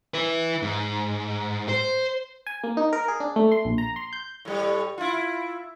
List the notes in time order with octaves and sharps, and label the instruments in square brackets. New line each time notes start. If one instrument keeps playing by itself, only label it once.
[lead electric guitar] E4 B4
G#2
C5
[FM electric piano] G#5
A#3
D#4
A#4
G#4
D4
A3
C6
A#1
A#5
C6
G6
[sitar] A2 G3
E4 F4